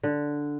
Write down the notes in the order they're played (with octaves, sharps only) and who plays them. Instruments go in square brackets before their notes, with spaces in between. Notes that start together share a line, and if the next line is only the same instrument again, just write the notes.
[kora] D3